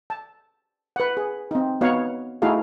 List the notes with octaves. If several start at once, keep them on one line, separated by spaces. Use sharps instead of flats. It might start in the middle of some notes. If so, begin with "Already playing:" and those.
A5
B4 F#5
G#4
C4 D#4
B3 D#4 F#4 C#5 F5 F#5
A3 D#4 E4 F#4 G#4 F5